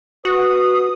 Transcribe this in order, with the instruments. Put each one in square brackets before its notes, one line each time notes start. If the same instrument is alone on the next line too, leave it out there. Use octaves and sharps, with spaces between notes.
[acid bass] F#4 [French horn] B4 [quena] D#6